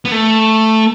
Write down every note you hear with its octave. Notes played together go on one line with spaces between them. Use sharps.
B3
A3